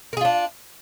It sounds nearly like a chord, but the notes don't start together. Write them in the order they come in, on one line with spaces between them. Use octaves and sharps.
A#4 G#4 F4 D4